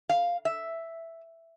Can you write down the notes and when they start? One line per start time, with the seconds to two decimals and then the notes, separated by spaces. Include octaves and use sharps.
0.09 F5
0.45 E5